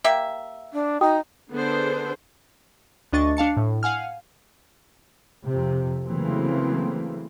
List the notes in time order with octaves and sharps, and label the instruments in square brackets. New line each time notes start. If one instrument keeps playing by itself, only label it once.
[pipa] A#3 G4 E5
[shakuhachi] D4
[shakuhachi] D#4 [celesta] F#4 G5 D#6
[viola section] D3 B3 D4 G#4 A4 C5
[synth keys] D2 D4 D#5 C#6 A6
D4 F5 A5 C#7
A2
F5 F#5 G#5 F6
[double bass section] F2 C3
C#3 E3 F#3 A3 A#3 C4